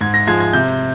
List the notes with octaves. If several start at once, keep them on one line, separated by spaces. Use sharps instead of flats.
G#2 G#6
A#6
F3 G#3 G#6
G#6
C3 G6